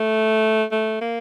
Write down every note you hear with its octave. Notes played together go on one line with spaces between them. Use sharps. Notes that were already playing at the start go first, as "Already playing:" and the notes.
Already playing: A3
A3
A#3